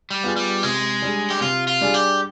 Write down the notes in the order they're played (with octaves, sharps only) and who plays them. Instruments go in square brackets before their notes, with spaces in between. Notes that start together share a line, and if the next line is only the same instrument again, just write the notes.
[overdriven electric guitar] G3
[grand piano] B3 F4 G#4
[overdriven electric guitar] G3
[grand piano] C3 [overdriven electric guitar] G#3
[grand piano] G3 D4 G#4
[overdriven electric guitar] G4
[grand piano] C3 [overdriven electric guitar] F4
[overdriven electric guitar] F4
[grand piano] G3 D4 G#4
[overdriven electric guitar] G4